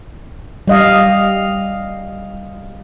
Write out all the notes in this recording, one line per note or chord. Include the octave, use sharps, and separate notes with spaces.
G3 D#5 F5